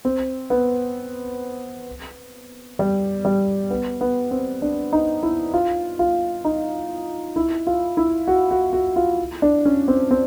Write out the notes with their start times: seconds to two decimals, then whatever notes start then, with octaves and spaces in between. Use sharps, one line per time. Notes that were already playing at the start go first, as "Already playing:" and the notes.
0.05 C4
0.50 B3
2.79 G3
3.25 G3
3.70 B3
4.01 B3
4.31 C4
4.62 D4
4.93 D#4
5.23 E4
5.54 F4
5.99 F4
6.45 D#4
7.36 E4
7.67 F4
7.97 E4
8.28 F#4
8.51 F#4
8.73 F#4
8.96 F4
9.42 D4
9.65 C#4
9.88 C4
10.11 C4